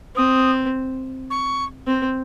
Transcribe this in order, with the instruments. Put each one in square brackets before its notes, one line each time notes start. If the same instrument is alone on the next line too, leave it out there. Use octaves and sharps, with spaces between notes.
[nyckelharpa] C4 [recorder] D#6
[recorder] C#6
[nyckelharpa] C4